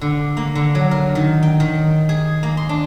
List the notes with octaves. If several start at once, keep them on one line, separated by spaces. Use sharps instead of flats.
D3
A#3
D3
F#3
A#4
D#3
G5
D#3
G#4
A#3
C6
D4